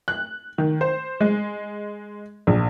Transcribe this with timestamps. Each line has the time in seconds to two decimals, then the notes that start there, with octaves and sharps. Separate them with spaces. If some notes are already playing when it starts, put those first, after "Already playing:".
0.08 F#6
0.58 D#3
0.81 C5
1.21 G#3
2.47 A#1